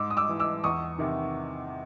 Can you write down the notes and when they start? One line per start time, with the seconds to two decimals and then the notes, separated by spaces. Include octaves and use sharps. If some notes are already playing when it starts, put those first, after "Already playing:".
Already playing: G#2 D6 E6
0.10 D#6
0.17 D6 E6
0.29 E3
0.40 D6 E6
0.64 E2 C#6 D#6
0.98 C3 D#3